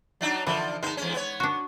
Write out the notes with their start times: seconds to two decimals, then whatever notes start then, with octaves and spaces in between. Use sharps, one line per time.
0.21 F#3 D4 D#4
0.47 D3 E3 F3
0.83 G#3 B3 D#4 A5
0.97 E2 C#4
1.14 B3 C#5
1.40 D4 F#4